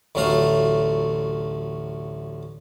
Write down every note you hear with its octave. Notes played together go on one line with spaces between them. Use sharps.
A1 D2 F#3 A3 F5 A#5